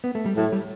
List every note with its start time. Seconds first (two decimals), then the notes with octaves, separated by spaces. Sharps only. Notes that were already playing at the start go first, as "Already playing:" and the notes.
0.04 B3
0.15 A3
0.26 G3
0.36 A2 F#3
0.52 G3